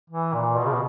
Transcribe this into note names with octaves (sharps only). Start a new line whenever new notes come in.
E3
A#2
B2
C#3
B2